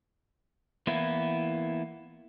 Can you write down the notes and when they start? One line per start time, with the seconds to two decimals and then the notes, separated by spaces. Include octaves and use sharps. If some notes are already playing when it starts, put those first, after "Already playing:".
0.87 E3 A#3 B3 E4